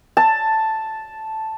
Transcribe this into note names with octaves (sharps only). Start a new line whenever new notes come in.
A5